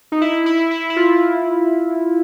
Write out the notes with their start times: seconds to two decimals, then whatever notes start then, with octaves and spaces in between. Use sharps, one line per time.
0.12 D#4
0.21 E4
0.46 E4
0.71 E4
0.90 E4
0.96 F4